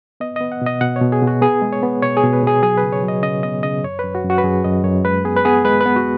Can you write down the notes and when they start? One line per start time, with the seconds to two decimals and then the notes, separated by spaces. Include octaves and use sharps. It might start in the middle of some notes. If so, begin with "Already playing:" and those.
0.20 B3 D#5
0.36 B3 D#5
0.52 F#5
0.62 B2 D#5
0.81 B2 F#5
0.96 C#5
1.01 B2
1.12 G#4
1.22 B2
1.27 F#4
1.42 B3 G#4
1.62 G#3
1.73 C#5
1.83 B3
2.02 B2 C#5
2.17 G#4
2.23 B2
2.33 B4
2.43 B2 G#4
2.62 F#3 G#4
2.77 B4
2.83 C#3
2.93 C#5
3.03 F#3
3.08 D#5
3.23 C#3 D#5
3.43 B3 D#5
3.63 C#3 D#5
3.83 F#2 C#5
3.99 B4
4.04 F#2
4.15 F#4
4.24 F#2
4.30 F#4
4.38 B4
4.44 F#2 G#4
4.64 F#2 D#5
4.84 F#2 C#5
5.05 G#3 B4
5.25 B3 G#4
5.36 B4
5.45 B3 G#4
5.65 G#3 B4
5.81 B4
5.86 B3
5.96 F#4